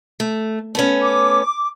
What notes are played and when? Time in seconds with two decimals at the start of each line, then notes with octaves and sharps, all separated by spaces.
0.20 A3
0.75 A3 B3 C#4
1.01 D6